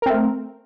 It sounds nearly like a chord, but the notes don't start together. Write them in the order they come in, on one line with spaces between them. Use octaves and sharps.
A#4 C4 A3